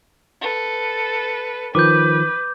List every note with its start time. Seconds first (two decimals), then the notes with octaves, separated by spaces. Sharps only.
0.42 A4 B4
1.75 D#3 F3 B4 D6 G6